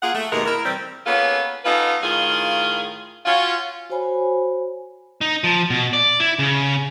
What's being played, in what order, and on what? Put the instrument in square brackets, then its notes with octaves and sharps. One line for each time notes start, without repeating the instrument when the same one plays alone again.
[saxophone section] A#3 F4 G#4 F#5
A3
D#2 B2 G#3 A3 A#4
E4 A#4
C3 E3 G3 C4
A#3 B3 C#4 F4 G#4 A4
B3 C#4 D#4 F4 A4 B4
A2 D#3 F4 G#4 F5
C#4 F4 F#4
[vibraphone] F#4 C5 C#5 G#5 B5
[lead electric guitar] D#4
F3
B2
D5
E4
C#3